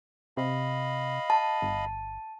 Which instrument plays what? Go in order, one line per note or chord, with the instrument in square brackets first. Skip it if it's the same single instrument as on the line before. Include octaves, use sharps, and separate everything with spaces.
[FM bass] C3 [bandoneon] D#5 F5 B5
[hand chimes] A5
[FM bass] G1